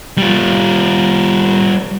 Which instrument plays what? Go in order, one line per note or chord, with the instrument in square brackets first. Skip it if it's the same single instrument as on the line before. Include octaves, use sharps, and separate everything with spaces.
[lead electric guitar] G3 F4